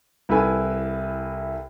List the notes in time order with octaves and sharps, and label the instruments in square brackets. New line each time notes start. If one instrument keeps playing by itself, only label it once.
[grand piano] C2 E4 A4 B4 G#5